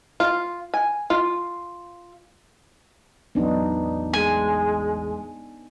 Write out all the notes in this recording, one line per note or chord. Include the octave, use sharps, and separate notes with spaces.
F4
G#5
F4
A1 E2 F#3 B3 D4 D#4
G#3 G#5